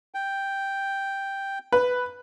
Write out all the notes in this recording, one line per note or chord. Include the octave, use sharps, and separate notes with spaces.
G5
B4